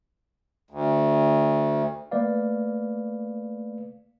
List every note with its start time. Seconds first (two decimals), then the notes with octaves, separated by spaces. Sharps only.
0.71 D2
2.11 A3 A#3 B4 D5 F5